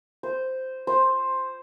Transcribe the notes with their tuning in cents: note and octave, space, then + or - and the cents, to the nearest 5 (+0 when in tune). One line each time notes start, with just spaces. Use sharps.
C5 -5
C5 +5